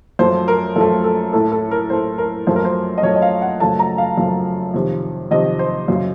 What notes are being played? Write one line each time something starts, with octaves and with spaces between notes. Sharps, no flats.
F#2 F3 A3 C5
A#4
F#2 F3 A3 A4
A4
A2 A3 A4
A4
A#4
A2 A3 C5
A#4
F#2 F3 A3 C5
A#4
C5
D#5
F#2 F3 A3 C#5
D#5
F5
F#5
F#2 C#3 F3 A3 A5
A#5
F5
F#2 C#3 F3 A3
F2 C3 D#3
F2 C3 D#3 D#5
C5
F#2 C#3 F#3